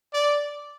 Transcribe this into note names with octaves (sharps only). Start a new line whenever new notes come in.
D5